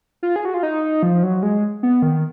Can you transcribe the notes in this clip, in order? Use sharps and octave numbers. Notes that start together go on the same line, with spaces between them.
F4
G#4
F#4
F4
D#4
F3
F#3
G#3
B3
D#3